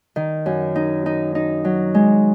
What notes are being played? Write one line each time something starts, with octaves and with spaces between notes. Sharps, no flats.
D#3
F#2
D#4
D#4
D#4
F#3
G#3